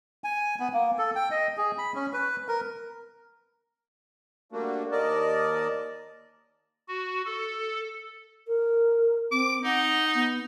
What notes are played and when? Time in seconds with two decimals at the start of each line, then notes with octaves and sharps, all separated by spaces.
0.24 G#5
0.60 B3
0.73 A#3
0.99 A4
1.16 G5
1.31 D#5
1.57 G#4
1.78 B5
1.95 C#4
2.13 B4
2.48 A#4
4.52 G3 A3 A#3 D4 F#4
4.92 D#2 A#4 D5 D#5 A5
6.88 F#4
7.26 A4
8.47 A#4
9.32 C4 D6
9.64 D#4 F#5
10.14 B3